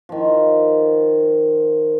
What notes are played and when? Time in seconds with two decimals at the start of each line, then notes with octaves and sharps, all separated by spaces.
0.09 D#3 F3